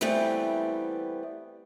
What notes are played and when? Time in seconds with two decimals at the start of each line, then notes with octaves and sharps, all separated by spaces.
0.01 E3 G3 A3 B3 C4